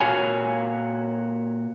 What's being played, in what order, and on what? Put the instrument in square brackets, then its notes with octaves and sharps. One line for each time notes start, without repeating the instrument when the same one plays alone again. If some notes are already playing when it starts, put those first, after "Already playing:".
[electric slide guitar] A#2 F#4 C#5 F5 G#5